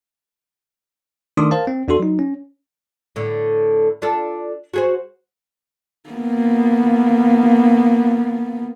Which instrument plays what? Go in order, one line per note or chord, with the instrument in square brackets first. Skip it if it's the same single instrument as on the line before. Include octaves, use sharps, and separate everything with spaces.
[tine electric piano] D#3 A3 D4 C6 D6 D#6
A#4 C5 F5 A5
C4
E2 D4 F#4 A4 C6
F#3 D#4
C#4
[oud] A2 D3
D4 F4 A4
F#4 G#4 C5
[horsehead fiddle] A#3 B3